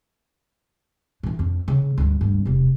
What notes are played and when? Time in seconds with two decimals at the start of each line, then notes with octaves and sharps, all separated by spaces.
1.23 A#2 E3
1.39 F2
1.68 C#3
1.98 D2 G2
2.21 D2 G2
2.45 E1 C3